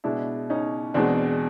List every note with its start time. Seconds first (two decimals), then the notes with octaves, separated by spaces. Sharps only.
0.04 B2 G#3 D4 E4
0.50 C#4 D#4
0.94 E2 B2 G#3 C4 D4